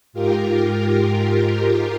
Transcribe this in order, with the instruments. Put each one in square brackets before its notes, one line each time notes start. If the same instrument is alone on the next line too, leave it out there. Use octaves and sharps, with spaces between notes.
[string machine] G#2 F4 G4 A#4